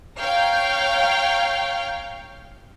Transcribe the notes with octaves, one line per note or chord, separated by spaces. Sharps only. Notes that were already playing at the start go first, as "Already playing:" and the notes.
C#5 F5 G5 A#5 F6 G6